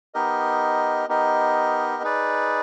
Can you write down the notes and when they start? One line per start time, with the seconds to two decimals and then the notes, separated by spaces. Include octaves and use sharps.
0.14 B3 D#4 G4 A#4 D#5
1.09 B3 D#4 G4 A#4 D#5
2.03 D#4 G#4 B4 D5